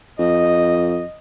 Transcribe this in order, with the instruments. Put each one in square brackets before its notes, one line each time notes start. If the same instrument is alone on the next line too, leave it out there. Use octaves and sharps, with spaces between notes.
[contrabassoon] F2 [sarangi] D#5